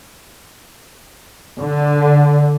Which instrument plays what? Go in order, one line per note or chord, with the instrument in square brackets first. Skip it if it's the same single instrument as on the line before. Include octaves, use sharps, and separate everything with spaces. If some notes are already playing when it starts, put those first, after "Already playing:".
[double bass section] D3